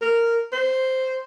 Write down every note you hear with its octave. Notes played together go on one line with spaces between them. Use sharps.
A#4
C5